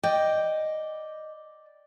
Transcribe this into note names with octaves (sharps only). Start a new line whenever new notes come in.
D5 D#5 G5